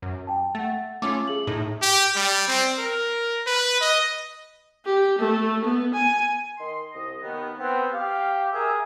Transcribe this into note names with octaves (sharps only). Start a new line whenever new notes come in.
F#2
G5 A5
A3 F#5 A6
A3 C#4 F4 D6
G#4 F#7
A2 D#4
G4
G3
C4
A#4
B4
D#5
G4
A3
B3
G#5
D#3 D#5 C6
C2 D#5
D#2 D#3 B3
B3 C4
G4 F5
G#4 A#4 E5